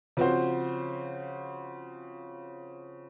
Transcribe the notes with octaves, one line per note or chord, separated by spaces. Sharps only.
C#3 F3 C4 F#4 C5